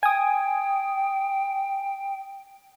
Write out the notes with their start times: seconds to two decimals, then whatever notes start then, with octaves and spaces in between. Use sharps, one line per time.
0.03 G5 G#5 D#6